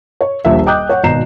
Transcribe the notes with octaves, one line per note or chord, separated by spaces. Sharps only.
C#5
D#1 A#1 E5
D#5 G5 D6 D#6 F#6 G6
C#5 F#5
G#1 B2 A#5 C7 E7